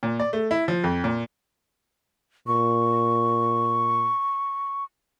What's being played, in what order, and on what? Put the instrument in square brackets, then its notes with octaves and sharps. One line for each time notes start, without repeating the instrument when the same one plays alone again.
[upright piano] A#2
D5
A3
E4
F3
F2
A#2
[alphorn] A#2 [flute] C#6